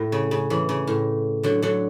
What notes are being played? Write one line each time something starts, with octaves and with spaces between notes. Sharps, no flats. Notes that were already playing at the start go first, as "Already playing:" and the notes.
Already playing: A2
C#3
C#3
C#3 E3
C#3
A2
D3 F#3
D3 F#3